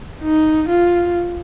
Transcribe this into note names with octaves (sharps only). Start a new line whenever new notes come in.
D#4
F4